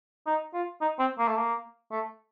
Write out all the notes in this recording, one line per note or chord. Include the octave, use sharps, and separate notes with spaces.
D#4
F4
D#4
C4
A#3
A3
A#3
A3